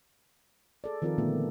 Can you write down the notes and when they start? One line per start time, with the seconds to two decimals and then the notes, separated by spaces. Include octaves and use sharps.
0.84 G#4 A4 D5
1.02 D#3 F3 C4 F4 A4 A#4
1.18 A#2 D3 A3 B3